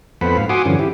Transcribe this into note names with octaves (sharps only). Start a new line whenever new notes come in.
F2 B3 A4 C5 F#5 B5
G#2 F5
F#4 F#5 G#5 C6 D6 D#6
G2 D3 E3 F3 C#4
E4 G4